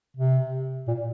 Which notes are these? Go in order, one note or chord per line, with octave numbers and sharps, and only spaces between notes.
C3
A#2